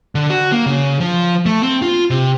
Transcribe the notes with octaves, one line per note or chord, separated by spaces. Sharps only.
D3
F#4
A#3
C#3
F3
A3
C4
F4
C3